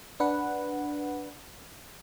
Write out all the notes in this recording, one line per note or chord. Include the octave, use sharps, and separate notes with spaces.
D4 B4 F#5